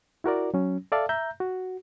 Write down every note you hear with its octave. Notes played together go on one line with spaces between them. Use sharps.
E4 F#4 A#4 D5
F#3 C#4
A4 D5 E5 F5 A5
E5 A#5 G6
F#4